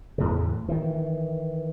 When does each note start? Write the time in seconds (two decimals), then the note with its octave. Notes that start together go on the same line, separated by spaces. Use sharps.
0.18 E2 A2 C#3
0.68 D#3 E3